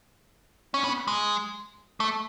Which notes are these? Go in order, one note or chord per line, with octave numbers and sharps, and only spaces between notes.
C#4
B3
G#3
A3